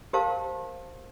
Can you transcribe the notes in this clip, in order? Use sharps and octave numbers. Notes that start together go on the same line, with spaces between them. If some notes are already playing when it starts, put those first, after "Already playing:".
G4 A#4 C5 F5 A5